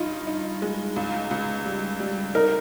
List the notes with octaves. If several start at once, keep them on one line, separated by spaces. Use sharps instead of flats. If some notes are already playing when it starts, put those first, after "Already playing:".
Already playing: G2 D#4 F4
D#4
G#3
C#2
C#2
G3
G3
D#4 A#4